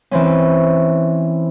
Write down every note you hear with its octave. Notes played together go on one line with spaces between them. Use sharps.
E3 C4 C#4